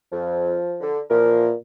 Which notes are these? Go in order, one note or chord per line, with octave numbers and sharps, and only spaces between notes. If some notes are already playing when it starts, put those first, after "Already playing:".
F2 F3
D3
A#2 E3 F3 A#4